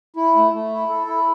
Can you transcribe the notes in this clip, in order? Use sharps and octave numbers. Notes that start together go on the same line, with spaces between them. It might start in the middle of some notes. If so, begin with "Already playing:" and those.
E4
A3
A3
E4
A4
E4